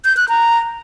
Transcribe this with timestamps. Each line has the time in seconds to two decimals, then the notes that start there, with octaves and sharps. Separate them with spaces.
0.05 G6
0.17 F#6
0.29 A#5